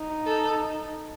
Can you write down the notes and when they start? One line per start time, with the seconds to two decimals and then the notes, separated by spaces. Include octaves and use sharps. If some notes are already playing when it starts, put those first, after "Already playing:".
Already playing: D#4
0.26 A4